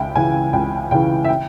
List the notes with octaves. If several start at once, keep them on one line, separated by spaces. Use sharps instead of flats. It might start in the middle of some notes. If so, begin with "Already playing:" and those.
Already playing: C#2 E5 G5
C#3 E3 G#5
C#2 G5
C#3 E3 G5
E5
G5